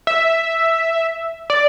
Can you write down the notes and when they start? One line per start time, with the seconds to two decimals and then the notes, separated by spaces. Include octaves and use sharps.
0.07 E5
1.50 D5